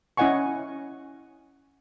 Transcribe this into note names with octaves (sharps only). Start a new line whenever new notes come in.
C#4 E4 D#5 F#5 G#5 C#6